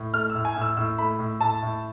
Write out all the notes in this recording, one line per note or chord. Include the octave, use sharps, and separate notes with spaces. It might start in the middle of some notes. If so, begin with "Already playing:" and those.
Already playing: A2
A3 F6
E6
A2
G#5
A2
E6
A2 E6
A3 B5
A2
A2 A5
A2